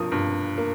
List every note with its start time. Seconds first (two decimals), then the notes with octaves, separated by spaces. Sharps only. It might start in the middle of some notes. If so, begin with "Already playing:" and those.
Already playing: G2 F3 A#3 D#6
0.12 G2
0.58 A#3